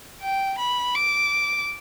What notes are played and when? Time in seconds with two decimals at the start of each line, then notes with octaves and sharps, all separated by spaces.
0.21 G5
0.59 B5
0.95 D6